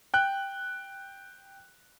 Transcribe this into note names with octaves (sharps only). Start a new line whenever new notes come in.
G5 F#6